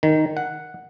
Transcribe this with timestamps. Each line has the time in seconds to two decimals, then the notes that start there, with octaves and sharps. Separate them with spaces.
0.03 D#3
0.37 F#5